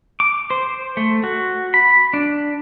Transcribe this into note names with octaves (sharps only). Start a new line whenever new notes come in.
D6
C5
A3
F#4
B5
D4